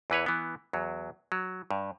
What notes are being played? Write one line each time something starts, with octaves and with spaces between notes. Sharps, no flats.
E2 E3 B4 C#5
E3 B3
E2 F#3
F#3
G2